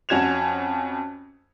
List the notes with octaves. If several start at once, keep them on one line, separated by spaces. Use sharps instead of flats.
F2 C#4 F#4 G#6 E7 F7